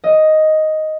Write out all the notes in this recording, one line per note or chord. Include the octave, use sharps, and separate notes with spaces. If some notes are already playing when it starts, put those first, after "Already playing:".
D#5